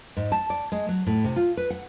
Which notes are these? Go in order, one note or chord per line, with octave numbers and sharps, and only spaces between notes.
G#2
A5
D5
G#3
F#3
A2
C3
F4
B4
F#5